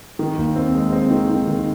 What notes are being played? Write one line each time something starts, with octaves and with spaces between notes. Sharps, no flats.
D#3
D#2
C4
G#3
C4
D#3
D#3
D#3